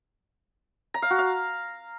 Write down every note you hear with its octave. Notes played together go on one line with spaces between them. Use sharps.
A#5
F5
F#4
F5